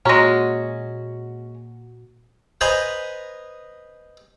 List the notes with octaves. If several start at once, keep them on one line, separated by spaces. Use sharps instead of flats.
A#2 G#3 C#4 F#4 A#5 A#6
B4 C5 D#5 G#5 A#5 B5